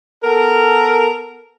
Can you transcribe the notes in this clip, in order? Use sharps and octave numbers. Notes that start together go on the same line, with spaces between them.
B3 A4 A#4